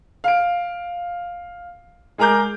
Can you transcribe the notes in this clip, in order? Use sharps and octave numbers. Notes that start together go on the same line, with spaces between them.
F5 D7
G#3 G#4 A#4 A#5 D6 G6